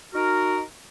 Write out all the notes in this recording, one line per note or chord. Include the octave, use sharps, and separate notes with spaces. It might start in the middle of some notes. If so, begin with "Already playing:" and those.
D#4 F#4 A#4